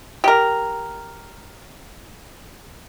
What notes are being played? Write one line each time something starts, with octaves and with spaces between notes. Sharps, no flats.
G4 A#4